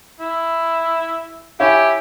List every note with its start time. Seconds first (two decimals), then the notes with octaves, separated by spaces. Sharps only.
0.20 E4
1.60 E4 G4 C#5 G#5